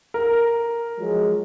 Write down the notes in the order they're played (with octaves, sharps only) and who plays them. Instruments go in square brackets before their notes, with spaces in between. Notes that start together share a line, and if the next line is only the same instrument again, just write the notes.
[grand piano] A#4
[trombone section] F3 F#3 G#3